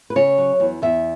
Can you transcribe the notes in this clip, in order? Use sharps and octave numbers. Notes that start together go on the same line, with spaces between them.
B4
C#3 C#5
F#3
E2
E2 E5